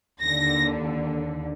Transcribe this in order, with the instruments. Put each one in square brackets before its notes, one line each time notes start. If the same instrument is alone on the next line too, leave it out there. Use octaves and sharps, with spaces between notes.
[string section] D#2 D3 A#6